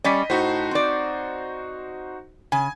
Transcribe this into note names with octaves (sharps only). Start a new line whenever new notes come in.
G3 C#4 D5 D#5 B6
A2 D#4 F#4 C5
C4 D5
C#3 G#5